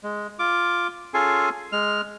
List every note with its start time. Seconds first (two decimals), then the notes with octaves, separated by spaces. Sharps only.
0.03 G#3
0.39 F4 D6
1.14 C#4 F4 G#4 A4 G#5 C6
1.72 G#3 F6